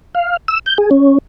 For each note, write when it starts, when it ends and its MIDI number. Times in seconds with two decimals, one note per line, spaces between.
0.15 0.37 77
0.48 0.59 88
0.66 0.78 91
0.78 0.90 68
0.91 1.18 61